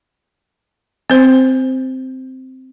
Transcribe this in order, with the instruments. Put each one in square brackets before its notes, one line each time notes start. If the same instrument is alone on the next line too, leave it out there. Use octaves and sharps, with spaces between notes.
[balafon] C4 C5